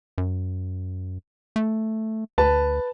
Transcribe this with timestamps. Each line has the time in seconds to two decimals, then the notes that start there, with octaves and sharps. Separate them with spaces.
0.18 F#2
1.56 A3
2.38 D2 B4 A5